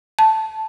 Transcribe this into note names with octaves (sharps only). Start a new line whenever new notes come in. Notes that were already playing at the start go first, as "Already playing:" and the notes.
A5